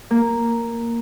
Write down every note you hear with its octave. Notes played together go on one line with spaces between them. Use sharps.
A#3